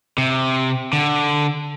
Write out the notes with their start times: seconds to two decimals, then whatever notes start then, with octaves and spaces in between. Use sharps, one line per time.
0.18 C3
0.93 D3